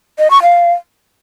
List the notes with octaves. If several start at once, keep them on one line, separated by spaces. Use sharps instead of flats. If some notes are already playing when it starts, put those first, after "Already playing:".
D#5
C#6
F5